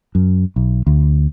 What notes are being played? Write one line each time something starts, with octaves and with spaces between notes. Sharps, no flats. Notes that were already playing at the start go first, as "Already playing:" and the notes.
F#2
B1
D2